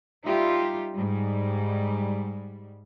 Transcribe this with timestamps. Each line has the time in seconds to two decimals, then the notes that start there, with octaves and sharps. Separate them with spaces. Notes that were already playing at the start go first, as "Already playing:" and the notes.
0.24 G3 D#4 F4 G4 E5
0.94 G#2 G3